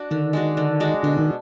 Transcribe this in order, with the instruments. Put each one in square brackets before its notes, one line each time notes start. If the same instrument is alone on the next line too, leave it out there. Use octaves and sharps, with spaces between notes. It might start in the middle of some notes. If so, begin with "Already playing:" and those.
Already playing: [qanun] D4 F#4
[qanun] D3 [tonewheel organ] D#3
[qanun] G#3 D4 F#4
D3
G#3 D4 F#4
[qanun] B2 [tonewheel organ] D3
[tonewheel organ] D#3